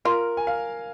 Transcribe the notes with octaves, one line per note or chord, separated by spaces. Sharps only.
F4 A#4
G#5
F5